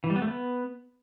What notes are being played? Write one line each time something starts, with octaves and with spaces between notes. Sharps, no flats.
E3
G3
B3
A3
B3